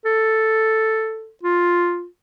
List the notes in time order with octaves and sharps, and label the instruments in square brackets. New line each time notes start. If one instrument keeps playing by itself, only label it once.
[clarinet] A4
F4